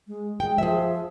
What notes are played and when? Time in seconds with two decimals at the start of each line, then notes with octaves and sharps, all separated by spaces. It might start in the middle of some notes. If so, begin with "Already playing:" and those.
0.07 G#3
0.40 G#3 G5
0.58 F3 G#4 E5